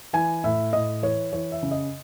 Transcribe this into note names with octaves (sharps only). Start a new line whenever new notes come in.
E3 G#5
A2 E5
A2 D#5
E3 C#5
E3 C#5
E5
C#3
D#5